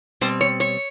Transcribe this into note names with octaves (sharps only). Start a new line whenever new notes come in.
B2 G3 C4 C5
C#5
C#5